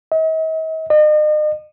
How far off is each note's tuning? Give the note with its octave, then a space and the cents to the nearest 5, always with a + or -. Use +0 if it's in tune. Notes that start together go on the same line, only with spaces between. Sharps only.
D#5 +45
D#5 -40